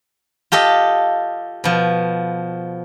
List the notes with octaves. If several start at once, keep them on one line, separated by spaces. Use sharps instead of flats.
F4 G4 A4 D#5
B2 F3